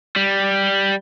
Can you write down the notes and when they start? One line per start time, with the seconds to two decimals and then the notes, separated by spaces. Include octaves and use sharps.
0.16 G3